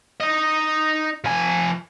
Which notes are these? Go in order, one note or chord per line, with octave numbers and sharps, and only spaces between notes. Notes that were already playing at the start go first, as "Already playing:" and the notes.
D#4 D#5
F3 G#5